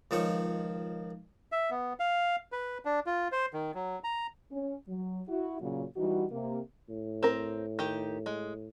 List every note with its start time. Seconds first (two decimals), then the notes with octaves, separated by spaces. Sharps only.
0.11 C#2 D#3 F3 C#5
1.52 E5
1.70 B3
2.00 F5
2.52 B4
2.85 D4
3.06 F4
3.32 C5
3.53 D#3
3.74 F#3
4.04 A#5
4.52 C#4
4.88 F#3
5.28 E4 F#4
5.61 A#2 C#3 F#3
5.97 E3 G3 D#4 F#4
6.31 C3 A#3
6.89 A2
7.23 C4 A#4
7.79 D#3 G4
8.26 G#3